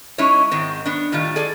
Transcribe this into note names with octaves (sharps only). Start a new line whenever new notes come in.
G#3 C#4 D#4 E4 C#5
G#2 D#3 G#3 C4
B3 D4
A2 D#3 G3 F4
G#4 A4 D5